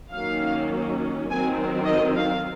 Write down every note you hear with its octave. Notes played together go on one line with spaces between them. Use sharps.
D#3 F#3 A#3 C#4 F5
D#3 F#3 C4 G#5
D#5
F5